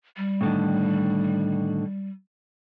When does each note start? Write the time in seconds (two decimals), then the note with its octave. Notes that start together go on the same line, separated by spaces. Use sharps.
0.17 G3
0.41 A2 D3 D#3